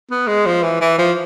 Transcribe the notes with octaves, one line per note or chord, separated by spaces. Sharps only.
B3
G#3
F3
E3
E3
F3